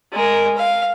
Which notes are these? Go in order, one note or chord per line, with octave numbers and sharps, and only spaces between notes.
G#3 A#4
F5